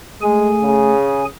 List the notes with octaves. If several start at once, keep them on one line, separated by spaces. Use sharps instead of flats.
G#3 A3 G#4 G#5
C#3